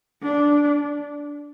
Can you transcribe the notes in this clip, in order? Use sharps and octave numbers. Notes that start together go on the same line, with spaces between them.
D4